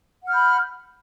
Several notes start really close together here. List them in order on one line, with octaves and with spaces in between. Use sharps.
F#5 F6 G6 B5